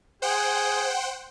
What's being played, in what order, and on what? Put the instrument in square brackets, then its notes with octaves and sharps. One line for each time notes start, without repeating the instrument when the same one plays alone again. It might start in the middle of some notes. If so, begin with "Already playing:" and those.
[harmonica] G#4 [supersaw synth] C5 F#5 G5